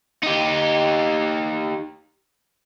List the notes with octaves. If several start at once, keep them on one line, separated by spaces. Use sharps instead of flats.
D#4 G4